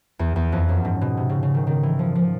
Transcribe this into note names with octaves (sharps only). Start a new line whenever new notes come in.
E2
E2
F2
F#2
G#2
B2
C3
C#3
C#3
D#3
D#3
E3
F3
F3